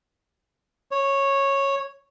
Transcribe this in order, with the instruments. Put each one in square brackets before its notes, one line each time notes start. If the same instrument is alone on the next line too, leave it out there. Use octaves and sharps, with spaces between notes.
[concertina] C#5